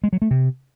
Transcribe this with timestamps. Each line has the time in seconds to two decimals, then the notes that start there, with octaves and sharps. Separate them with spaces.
0.04 G#3
0.13 F#3
0.22 A3
0.31 C3